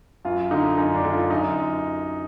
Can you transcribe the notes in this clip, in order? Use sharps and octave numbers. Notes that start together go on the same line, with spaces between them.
F#2 F4
D3 D#4
F#2 D#4
D4
D3
F4
F#2 D#4